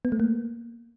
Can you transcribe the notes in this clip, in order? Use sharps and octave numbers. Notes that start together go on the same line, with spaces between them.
B3
A3
A#3